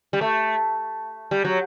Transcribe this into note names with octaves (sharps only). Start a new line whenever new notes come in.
G3
A3
G3
F#3